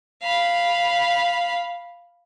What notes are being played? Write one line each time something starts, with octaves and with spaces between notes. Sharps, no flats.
F5 B5